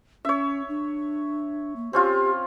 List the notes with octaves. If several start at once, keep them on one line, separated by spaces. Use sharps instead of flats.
C#4 C#5 E5
D4
A#3
C4 C#4 F4 G4